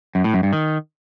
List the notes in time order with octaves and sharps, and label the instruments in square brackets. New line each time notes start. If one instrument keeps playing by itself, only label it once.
[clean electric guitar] F#2
A2
F#2
G2
D#3